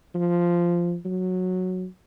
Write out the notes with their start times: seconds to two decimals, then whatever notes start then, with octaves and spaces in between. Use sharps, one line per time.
0.15 F3
1.05 F#3